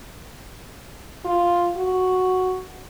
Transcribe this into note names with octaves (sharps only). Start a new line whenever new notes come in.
F4
F#4